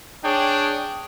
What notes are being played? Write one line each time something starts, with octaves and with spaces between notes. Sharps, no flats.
D4 G#4 C#5 G5